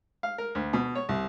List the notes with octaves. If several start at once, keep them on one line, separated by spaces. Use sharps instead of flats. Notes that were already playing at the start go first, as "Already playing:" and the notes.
F5
A#4
D2
B2
C#5
C2